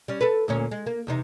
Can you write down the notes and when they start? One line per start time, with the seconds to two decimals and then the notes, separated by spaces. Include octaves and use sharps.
0.08 G3 C#4
0.21 A4 B4
0.48 D2 A#2 C#4
0.71 G#3
0.86 A#3
1.07 E2 C3 D#4